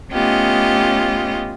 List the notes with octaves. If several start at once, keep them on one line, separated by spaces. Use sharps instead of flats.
A3 B3 C#4 F4 G4 D#5